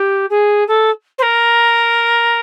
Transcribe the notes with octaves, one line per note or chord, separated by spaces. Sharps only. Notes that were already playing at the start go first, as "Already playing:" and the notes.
Already playing: G4
G#4
A4
C5
A#4